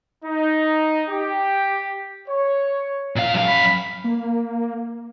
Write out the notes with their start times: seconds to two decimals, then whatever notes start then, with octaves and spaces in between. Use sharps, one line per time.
0.25 D#4
1.10 G4
2.28 C#5
3.16 A#2 F5
3.34 F#2 F5
3.48 B5
4.04 A#3